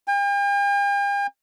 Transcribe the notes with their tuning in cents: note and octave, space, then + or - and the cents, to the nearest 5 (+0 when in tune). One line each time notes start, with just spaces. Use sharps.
G5 +45